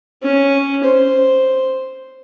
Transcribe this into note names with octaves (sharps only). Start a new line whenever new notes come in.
C#4
C5